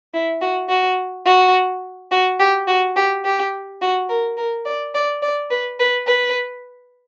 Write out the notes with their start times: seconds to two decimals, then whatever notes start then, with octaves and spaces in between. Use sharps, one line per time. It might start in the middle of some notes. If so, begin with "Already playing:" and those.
0.14 E4
0.41 F#4
0.69 F#4
1.26 F#4
2.11 F#4
2.40 G4
2.68 F#4
2.96 G4
3.25 G4
3.82 F#4
4.09 A#4
4.37 A#4
4.65 D5
4.95 D5
5.22 D5
5.51 B4
5.79 B4
6.07 B4